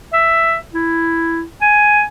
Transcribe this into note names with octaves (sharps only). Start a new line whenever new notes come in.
E5
E4
G#5